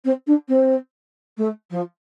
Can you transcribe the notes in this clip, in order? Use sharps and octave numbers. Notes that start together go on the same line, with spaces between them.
C4
D4
C4
A3
F3